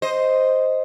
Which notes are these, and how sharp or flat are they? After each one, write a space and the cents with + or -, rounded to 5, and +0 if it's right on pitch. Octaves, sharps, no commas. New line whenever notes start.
C5 +0 D#5 +0